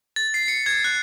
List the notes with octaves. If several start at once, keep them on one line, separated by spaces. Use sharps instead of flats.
A6
C7
C#7
G#6
F#6